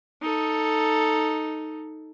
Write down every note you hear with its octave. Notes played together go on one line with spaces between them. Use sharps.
D#4 A4